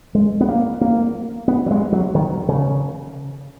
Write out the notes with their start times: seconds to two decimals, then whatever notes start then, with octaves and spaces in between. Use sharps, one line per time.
0.15 G#3
0.41 B3
0.48 A#3
0.81 A#3
1.48 B3
1.66 F#3
1.71 G#3
1.92 F#3
2.15 D#3
2.49 C#3